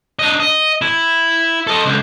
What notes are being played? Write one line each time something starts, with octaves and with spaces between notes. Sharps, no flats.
D4 D#5
D#5
E4
A4 D#5
C#2 D3